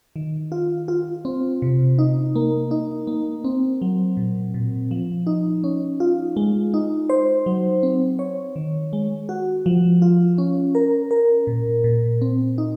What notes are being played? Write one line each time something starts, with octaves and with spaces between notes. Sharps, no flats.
D#3
F4
F4
C4
C3
D#4
A#3
D#4
A#3
C4
F#3
A#2
A#2
F3
D#4
C#4
F4
G#3
D#4
C5
F#3
C4
C#5
D#3
G#3
F#4
F3
F4
C#4
A#4
A#4
A#2
A#2
C4
D#4